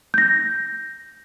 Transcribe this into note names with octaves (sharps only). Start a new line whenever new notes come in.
G6 A#6